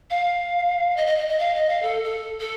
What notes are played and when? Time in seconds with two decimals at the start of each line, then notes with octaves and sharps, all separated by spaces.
0.10 F5
0.97 D#5
1.07 D#5
1.18 D#5
1.29 D#5
1.39 F5
1.55 D#5
1.69 F5
1.82 A4
2.04 A4
2.40 A4